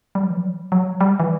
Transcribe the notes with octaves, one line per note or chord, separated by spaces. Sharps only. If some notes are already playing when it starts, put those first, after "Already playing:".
G3
F#3
E3
F#3
F#3
G3
E3